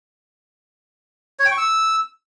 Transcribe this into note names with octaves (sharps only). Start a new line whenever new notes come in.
C#5
G5
C#6
E6